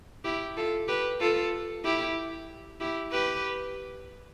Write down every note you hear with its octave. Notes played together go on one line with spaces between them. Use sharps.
E4 G4
F4 A4
G4 B4
F4 A4
E4 G4
E4 G4
G4 B4